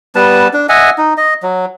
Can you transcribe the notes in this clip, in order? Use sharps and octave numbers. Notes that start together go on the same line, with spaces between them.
G3 B3 B4 A5
D4
D#5 E5 F#5 G#5
D#4
D#5
F#3